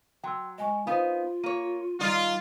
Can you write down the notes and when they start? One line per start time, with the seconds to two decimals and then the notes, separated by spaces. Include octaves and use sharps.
0.24 F#3 G5 C6 E6
0.58 G#3 D#5 G#5 C#6
0.87 B3 D#4 F4 C5 F5
1.44 A#3 C#5 D#7
2.01 D#3 G3 D#4 F4 D5